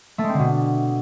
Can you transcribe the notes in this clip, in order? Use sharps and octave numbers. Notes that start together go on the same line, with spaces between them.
A3
G#3
C4
D3
B2